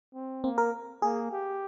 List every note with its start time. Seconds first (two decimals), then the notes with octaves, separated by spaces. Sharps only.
0.14 C4
0.44 A#3 C4
0.58 A#4
1.02 A#3 G#4
1.31 G4